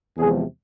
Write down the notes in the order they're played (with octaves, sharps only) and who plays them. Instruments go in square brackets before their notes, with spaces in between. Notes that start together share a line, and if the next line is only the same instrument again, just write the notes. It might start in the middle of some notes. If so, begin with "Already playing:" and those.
[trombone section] E2 C3 F3 G#3 G#4